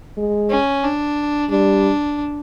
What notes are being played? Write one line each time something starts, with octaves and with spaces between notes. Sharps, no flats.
G#3
C#4
D4
G3 D4